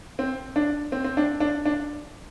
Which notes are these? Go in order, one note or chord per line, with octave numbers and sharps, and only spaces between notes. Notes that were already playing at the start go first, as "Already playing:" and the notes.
C4
D4
C4
C4
D4
D4
D4